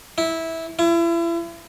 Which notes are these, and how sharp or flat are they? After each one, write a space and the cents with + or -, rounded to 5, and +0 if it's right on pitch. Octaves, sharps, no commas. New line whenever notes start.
E4 -15
E4 +35